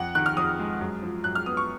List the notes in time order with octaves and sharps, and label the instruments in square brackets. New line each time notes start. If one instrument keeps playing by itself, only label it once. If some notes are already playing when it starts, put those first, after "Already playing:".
Already playing: [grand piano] F2 F#5
D#3 F#6
F6
F2 D#6
G#3
F#2
F3
F#2 F#6
F6
B3 D#6
C#6